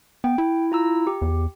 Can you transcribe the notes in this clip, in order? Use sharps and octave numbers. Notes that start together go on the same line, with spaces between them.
B3 G5
E4
F4 A#5 E6
G4
E2